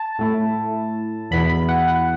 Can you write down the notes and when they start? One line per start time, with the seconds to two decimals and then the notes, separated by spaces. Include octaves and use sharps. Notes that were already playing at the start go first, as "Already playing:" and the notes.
Already playing: A5
0.19 A2 A3 E4
1.31 E2 B2 B3 E4 B5
1.49 B5
1.69 F#5
1.88 F#5